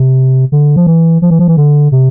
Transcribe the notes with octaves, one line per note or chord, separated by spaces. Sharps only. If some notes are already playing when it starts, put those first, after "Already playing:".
Already playing: C3
D3
F3
E3
F3
E3
F3
E3
D3
C3